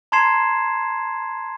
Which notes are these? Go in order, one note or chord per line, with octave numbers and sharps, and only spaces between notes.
A5 A#5 C6 G#6 C7 E7